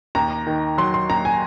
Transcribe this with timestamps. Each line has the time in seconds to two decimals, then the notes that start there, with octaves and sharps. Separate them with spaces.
0.15 D#2 A#5
0.47 D#3
0.78 F#3 C6
0.94 C6
1.10 D#2 A#5
1.25 G#5